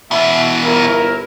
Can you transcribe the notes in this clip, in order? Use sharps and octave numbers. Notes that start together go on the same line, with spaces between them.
B2 E3 E5
G1 E4 A#4